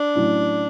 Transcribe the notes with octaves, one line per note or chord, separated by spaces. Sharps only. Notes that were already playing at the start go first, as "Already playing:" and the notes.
Already playing: D4
A2 F#3 C#4 E4